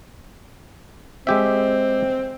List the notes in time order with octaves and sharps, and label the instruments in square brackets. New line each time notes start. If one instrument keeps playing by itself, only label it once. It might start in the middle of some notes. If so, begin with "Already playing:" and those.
[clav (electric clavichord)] G#3 G4 E5 [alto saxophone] C4